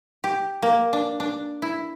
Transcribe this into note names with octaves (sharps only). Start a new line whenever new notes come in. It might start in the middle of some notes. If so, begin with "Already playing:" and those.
G4
A#3
D4
D4
E4